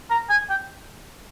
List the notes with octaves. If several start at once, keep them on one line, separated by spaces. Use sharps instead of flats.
A#5
G#5
G5